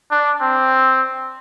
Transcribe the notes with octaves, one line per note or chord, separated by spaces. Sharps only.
D4
C4